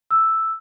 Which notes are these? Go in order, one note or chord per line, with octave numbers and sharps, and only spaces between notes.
E6